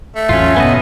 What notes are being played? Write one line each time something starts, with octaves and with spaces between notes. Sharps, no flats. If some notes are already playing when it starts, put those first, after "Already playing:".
A3
A1 E2 F#3 C#4 F4
G1 B2 B3 D#5